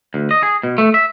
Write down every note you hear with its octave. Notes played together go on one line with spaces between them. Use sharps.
D2
D#5
G#4
B2
A3
E5